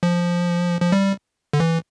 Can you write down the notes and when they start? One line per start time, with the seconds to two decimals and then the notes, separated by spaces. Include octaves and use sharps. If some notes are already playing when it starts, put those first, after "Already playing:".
0.03 F3
0.81 F3
0.92 G3
1.53 D3
1.60 E3